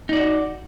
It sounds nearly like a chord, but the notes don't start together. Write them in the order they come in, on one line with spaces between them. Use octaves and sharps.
D#4 D5 F#4